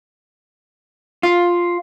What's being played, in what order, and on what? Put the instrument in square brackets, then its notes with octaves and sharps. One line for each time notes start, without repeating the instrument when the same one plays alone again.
[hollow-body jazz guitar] F4